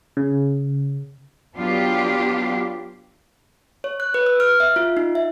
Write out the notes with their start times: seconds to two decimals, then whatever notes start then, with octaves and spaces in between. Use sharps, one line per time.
0.17 C#3
1.57 F#3 B3 D4 F4 G4
3.84 C#5
4.00 F#6
4.14 B4
4.26 E6
4.40 F6
4.60 E5
4.76 F4
4.97 D#4
5.15 E5